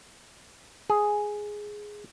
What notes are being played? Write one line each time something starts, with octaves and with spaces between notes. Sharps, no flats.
G#4